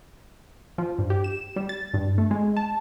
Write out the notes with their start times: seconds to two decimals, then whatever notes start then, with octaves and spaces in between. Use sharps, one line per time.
0.78 F3
0.99 G2
1.10 G4
1.24 E7
1.56 G3
1.69 A6
1.94 G2
2.18 A3
2.31 G#3
2.57 A5